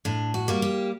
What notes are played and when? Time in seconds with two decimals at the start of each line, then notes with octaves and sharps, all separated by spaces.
0.05 A2 D4
0.34 F#4
0.48 G3 A#3
0.62 G4